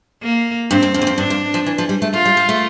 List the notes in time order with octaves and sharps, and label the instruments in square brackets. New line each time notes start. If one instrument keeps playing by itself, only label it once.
[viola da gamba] A#3
[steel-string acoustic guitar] G2 [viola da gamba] C4
[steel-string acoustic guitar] F2
F2
E2
F2
[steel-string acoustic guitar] G2 [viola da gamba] D4
[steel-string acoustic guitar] F2
F3
E3
F3
G3
A3
[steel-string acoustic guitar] A3 [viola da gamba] F4
[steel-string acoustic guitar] G3
G3
A3